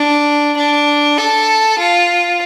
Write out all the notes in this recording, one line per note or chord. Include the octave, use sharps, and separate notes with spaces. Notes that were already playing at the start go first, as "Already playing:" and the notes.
Already playing: D4
D4
A4
F4